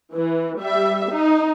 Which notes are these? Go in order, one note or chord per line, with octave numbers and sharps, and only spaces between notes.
E3
G3 E5
D#4